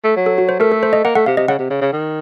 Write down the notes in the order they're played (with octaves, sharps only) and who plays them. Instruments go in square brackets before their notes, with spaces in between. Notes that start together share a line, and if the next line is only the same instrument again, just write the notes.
[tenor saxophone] A3
F#3
[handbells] A4
F#4
C5
[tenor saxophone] A3 [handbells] A#4
[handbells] A4
C5
D#5
[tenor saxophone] A#3 [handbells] F#5
[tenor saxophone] A3 [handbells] F#5
[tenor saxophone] C3 [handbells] F5
[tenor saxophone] C3 [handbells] D#5
[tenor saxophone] C#3 [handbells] F#5
[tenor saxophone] C3
C#3
C#3
D#3